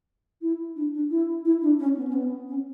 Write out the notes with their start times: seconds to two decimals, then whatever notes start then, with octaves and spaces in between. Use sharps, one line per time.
0.41 E4
0.76 D4
0.93 D4
1.10 E4
1.45 E4
1.62 D4
1.79 C#4
1.96 B3
2.07 C#4
2.13 B3
2.48 C#4